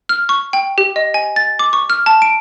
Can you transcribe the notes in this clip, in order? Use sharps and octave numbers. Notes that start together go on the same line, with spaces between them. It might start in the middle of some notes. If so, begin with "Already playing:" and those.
F6
C#6
G5
G4
D#5
G#5
A6
D6
C#6
F6
A5
D7